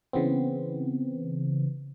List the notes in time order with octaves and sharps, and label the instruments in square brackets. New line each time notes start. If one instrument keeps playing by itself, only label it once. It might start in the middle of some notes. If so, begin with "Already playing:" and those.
[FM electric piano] C#3 E3 B3 C4